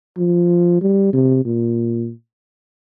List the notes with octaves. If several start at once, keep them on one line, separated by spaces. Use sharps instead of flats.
F3
G3
C3
A#2